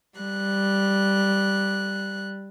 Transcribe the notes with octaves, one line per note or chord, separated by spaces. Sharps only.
G3 F#6